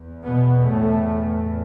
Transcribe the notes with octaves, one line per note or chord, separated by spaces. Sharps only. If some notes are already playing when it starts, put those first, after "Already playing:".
Already playing: E2
B2 B3
A2 A3